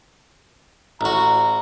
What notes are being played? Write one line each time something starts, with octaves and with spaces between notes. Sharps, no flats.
A1 F#4 A#5